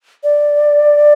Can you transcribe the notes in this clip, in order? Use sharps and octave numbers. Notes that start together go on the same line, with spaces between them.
D5